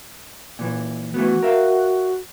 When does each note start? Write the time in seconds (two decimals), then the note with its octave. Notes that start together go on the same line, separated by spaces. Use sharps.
0.59 A#2 E3
1.14 E3 A3 B3 F#4
1.43 A#4 E5 F5